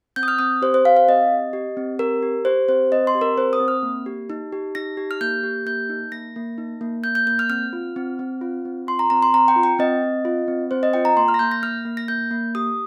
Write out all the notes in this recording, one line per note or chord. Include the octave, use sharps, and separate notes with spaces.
C4 G6
D#6
F6
C4 D#6
G4 C5
C5
C4 F5
F5
C4 D#5
G4
G4
C4
G4 A#4
G4
G4 C5
C4 C5
C4 D#5
C6
G4
A#4
C4 C5
D#6
C4
F6
A#3
G4
D#4
G4
D#4 A#6
G4
F6
A#3 G6
G4
A#3 G6
D#4
A#3 A#6
A#3
D#4
A#3
A#3 G6
G6
A#3 G6
F6
C4 F6
F4
C4
C4
F4
C4
F4 C6
A#5
C4 A#5
C6
C4 A#5
G5
F4
G5
C4 D#5
C4
F4
C4
C4 C5
D#5
F4 G5
A#5
A#3 C6
F6
A#6
A#3 G6
A#6
A#3 F6
A#3
A#6
A#3 G6
A#3
G4 D#6